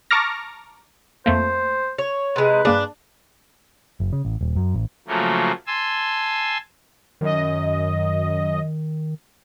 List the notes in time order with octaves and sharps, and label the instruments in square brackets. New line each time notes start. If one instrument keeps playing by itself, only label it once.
[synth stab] A5 A#5 C#6 D6 F6 A#6
[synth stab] F2 A3 A#3 [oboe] C5
[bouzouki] C#5
[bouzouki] C3 G#3 [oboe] B4
[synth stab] G2 A#3 G#4 [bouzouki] D4
[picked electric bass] F#1
C#3
A1
D#1
F#2
A1
[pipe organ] C#3 F3 F#3 A3 A#3
G#5 A5 C6 E6
[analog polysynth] F#2 D#5 [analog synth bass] D#3